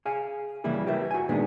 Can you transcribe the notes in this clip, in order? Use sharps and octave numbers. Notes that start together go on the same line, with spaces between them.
G#4 F5 G#5
C#3 E3 G3 A#3 E4 G#4
G4 A#4 B4 E5
F#4 G#5
A#2 D#3 G#3 B3 D4 G#4